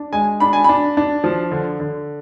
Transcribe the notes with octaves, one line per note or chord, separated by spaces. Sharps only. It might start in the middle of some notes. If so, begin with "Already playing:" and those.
Already playing: D4
G#3 G#5
D4 B5
G#5
D4 B5
D4
F3
D3
D3